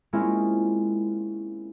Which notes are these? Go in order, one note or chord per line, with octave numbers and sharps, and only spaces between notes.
G#3 A#3 C4 C#4 E4 F4